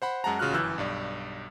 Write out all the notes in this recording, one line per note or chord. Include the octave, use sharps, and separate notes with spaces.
C5 F#5 B5
F#2 G#3 F#5 A5 A#5
A1 C#3 F4 F#4 F6 F#6
G1 F#2 E3 E6 F#6 G6
B1 G2 D5